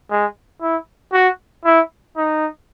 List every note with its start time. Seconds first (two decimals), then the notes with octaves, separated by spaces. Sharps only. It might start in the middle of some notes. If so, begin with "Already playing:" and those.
0.10 G#3
0.61 E4
1.13 F#4
1.65 E4
2.17 D#4